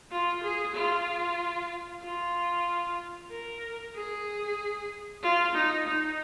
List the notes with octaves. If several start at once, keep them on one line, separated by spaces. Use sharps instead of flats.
F4
G#4
F4
F4
A#4
G#4
F4
D#4
D#4